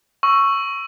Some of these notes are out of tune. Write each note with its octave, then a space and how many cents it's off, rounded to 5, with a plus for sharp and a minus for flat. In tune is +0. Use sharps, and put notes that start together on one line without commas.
C#6 +0 E6 +15